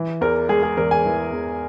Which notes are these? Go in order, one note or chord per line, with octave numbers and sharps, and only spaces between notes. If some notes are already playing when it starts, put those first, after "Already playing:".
Already playing: E3
E2 A#4
G#3 G#4
G#4
E2 A#4
G#5
E3
E2